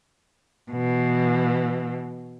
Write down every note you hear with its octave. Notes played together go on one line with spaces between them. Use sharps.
B2 E3